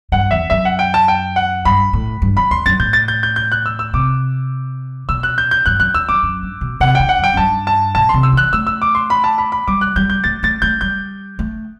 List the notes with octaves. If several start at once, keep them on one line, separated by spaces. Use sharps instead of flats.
G2 F#5
E2 E5
F#2 E5
F#5
G5
A5
G5
F#5
G2 B5
A2
G2
F#2 B5
E2 C6
F#2 A6
A2 G6
A6
G6
G6
G6
F#6
E6
E6
C3 D6
B2 E6
F#6
G6
G6
G2 F#6
F#2 F#6
E2 E6
F#2 D6
F#2
G2
B2
C3 F#5
D3 G5
F#5
F#2 G5
F#2
G2 A5
A5
B2 A5
C3 C6
E6
E3 F#6
A3 E6
E6
D6
C6
B5
A5
B5
B5
G3 D6
F#6
G3 G6
G6
A3 A6
A3 A6
A3 G6
G3 G6
A3